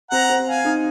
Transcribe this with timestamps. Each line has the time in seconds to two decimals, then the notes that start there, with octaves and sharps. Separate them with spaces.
0.11 C4 F#5 A#5
0.30 C4
0.47 F5 G#5
0.65 D#4